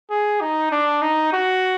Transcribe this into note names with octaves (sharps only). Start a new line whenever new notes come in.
G#4
D#4
D4
D#4
F#4